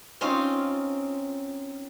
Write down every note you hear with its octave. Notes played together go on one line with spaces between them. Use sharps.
C4 C#4 D#4 F4